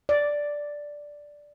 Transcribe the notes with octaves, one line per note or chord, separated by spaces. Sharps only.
D5